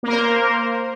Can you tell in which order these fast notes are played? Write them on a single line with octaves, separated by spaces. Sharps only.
A#3 A#4 C5